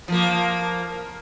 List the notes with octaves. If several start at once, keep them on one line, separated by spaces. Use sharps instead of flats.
F3 A#3